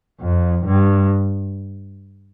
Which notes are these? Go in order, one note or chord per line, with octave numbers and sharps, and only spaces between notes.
F2
G2